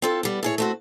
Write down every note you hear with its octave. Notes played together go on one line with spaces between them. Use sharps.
C4 F4 A4
G3 B3
A2 G#4 C#5
A3 C4 F#4